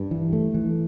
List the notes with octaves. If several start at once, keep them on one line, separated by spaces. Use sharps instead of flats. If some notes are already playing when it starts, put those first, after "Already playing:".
Already playing: G2
E3
A3
E3